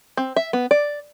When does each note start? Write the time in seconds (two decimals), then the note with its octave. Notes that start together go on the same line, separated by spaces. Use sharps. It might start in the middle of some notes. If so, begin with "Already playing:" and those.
0.17 C4
0.36 E5
0.53 B3
0.71 D5